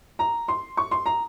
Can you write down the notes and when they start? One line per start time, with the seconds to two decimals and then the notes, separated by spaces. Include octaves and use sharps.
0.19 A#5
0.48 C6
0.77 C#6
0.91 C6
1.06 A#5